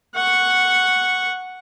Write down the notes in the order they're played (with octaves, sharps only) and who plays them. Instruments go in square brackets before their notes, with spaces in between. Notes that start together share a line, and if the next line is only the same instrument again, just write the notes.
[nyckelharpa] F#5 C#6